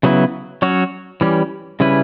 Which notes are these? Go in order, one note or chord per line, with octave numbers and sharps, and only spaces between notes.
C#3 F#3 B3 E4
F#3 C#4 F#4 C#5
E3 G3 C#4 G4
C#3 G3 C#4 E4 B4